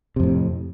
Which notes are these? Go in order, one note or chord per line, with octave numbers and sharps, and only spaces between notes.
F2 A2 C3